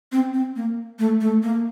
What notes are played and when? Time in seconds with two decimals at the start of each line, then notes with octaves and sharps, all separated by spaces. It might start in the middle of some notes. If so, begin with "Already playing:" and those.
0.12 C4
0.34 C4
0.56 A#3
0.99 A3
1.21 A3
1.43 A#3